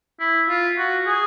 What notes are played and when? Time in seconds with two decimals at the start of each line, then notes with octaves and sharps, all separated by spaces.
0.20 E4
0.49 F4
0.78 F#4
1.07 G#4